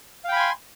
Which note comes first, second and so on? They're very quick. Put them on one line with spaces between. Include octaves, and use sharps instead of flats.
F5 G5 B5 G#5 C6